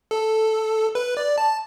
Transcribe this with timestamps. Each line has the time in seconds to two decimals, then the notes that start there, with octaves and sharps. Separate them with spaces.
0.11 A4
0.95 B4
1.17 D5
1.38 A5